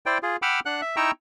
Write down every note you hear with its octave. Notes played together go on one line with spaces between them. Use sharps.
E4 C5 D5 G5
F4 G#4
F#5 G5 B5 D6 E6 F6
D4 F#5 F#6
E5
D#4 E4 G5 A#5 C#6 E6